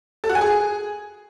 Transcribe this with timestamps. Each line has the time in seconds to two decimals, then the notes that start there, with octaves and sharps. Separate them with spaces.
0.24 A4
0.29 F#4
0.35 G#5
0.41 G#4